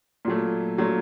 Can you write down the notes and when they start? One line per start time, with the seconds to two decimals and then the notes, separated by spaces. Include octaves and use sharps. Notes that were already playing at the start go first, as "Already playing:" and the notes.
0.25 A#2 F#3 A3
0.78 A#2 F#3 A3